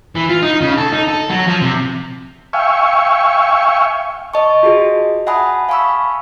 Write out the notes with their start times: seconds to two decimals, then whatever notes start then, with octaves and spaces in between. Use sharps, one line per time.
0.15 E3
0.29 F4
0.43 D#4
0.62 C#3
0.78 A4
0.92 D#4
1.08 A4
1.30 F#3
1.47 F3
1.62 C3
2.53 E5 F5 G5 G#5 C#6
4.34 D#5 A5 C#6
4.63 F4 F#4 G#4 D#5
5.27 E5 F#5 G#5 A5 B5 D#6
5.69 F5 G#5 A5 B5 C#6 E6